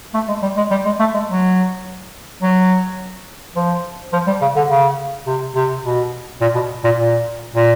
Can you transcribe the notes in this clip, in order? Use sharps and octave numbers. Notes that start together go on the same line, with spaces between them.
A3
G#3
G3
G#3
G3
G#3
A3
G#3
F#3
F#3
F3
F3
G3
C#3
D3
C#3
C3
C3
B2
A#2
B2
A#2
A#2
A#2